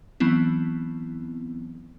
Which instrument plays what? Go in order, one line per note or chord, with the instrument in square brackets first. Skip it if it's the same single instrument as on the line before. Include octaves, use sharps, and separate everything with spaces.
[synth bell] E3 F#3 B3 C4 E4